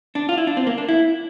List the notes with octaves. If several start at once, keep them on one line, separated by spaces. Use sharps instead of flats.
D4
F4
E4
D4
C4
A#3
D4
E4